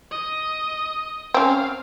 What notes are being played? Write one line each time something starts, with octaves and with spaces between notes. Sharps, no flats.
D#5
C4 C#4 F5